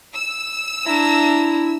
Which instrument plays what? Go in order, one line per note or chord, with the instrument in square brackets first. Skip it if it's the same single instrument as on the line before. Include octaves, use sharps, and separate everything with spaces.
[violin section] E6
[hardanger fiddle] D4 A#5 [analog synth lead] E4